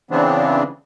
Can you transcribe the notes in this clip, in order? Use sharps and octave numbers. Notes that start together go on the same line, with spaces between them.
C#3 E3 B3 C4 D4